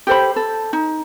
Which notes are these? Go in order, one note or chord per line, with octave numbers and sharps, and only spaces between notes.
G4 A4 C5 B5
A4
D#4